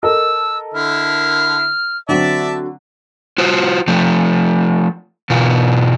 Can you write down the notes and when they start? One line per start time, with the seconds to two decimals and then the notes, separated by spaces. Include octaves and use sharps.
0.03 A4 A#4 D#5 E6
0.74 D3 E4 F6
2.09 D3 F#3 C4 D5 E5 A5
3.38 F4 F#4 C5
3.88 F3 A3
5.30 B2 E3 F4